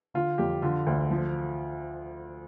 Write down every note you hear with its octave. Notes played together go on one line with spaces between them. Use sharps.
D3 F4
F2 G4
D3 F4
D2
F3